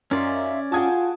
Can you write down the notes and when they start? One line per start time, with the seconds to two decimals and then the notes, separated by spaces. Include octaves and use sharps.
0.11 F#2 C#4 D#4 F4 D5 E5
0.72 F4 F#4 G#4 G5 A5 D#6 G#6